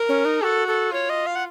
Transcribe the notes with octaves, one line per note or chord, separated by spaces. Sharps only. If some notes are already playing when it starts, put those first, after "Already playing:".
Already playing: A#4
C#4
D#4
F#4 A4
A4
F4 C#5
D#5
F5
F#5